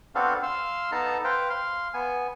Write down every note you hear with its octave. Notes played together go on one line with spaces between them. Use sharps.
B3 C4 D4 F#4 A4 F5
F5 C6 E6
B3 D#4 A4 A5 A#5
B4 C5 F5 G5
F5 C6
B3 G#5